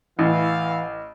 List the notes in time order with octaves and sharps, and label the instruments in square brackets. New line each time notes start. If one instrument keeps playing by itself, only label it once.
[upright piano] A1 [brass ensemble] E3 F5